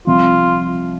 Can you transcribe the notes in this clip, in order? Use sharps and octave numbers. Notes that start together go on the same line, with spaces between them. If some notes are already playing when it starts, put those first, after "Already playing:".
C2 C3 F3 F4